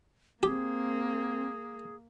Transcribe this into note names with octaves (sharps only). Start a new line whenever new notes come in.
A#3 C4 G4 G#4